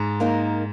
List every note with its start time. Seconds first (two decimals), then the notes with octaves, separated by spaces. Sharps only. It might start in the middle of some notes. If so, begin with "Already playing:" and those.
Already playing: G#2
0.20 A#3 D#4 A#4